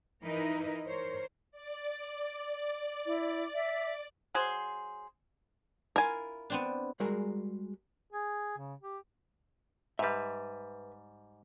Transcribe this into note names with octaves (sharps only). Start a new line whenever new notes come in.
E3 D#4 E4 A#4 B4 D#5
A#4 C5 C#5
D5
E4
E5
F#3 G#4 C5
E4 F4 A#4 G#5
B3 C4 D4
G3 G#3 F#4 G#4 A#4 A#5
G#4
C#3
G4
G#2 G3 B4 E5